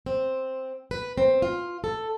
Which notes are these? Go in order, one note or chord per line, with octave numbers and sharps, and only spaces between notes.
C4
B4
C4
F4
A4